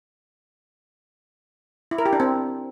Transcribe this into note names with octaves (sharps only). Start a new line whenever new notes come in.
E4
A#4
G4
D4
C4